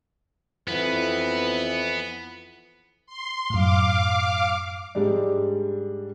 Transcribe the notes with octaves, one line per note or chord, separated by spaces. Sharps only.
F2 E3 B3
C6
F#2 A2 F5 D6
G#2 G3 G#3 D4